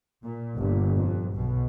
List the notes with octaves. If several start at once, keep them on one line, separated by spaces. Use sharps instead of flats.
A#2
G1 A#2
F2
B1 B2